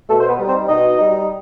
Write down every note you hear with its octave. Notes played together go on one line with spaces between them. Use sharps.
B2 A3 A4
C5
B3 B4
G3 D#4
C4 C5
B2 D#4 D#5
G3 D#4